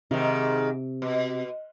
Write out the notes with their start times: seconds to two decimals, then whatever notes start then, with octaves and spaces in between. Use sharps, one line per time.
0.11 G#2 C3 D#3
1.02 B2